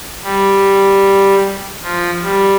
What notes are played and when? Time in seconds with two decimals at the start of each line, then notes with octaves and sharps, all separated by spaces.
0.24 G3
1.83 F3
2.23 G3